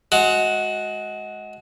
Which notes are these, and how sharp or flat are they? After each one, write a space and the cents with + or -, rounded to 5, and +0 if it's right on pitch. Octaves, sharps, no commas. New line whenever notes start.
G#3 +25 F#4 +0